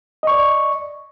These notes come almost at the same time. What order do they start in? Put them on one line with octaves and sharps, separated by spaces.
D#5 C#6 D5